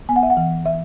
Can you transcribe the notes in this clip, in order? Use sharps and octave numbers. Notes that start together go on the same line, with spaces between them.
B3 G#5
F#5
E5
F#5
E3
E3 E5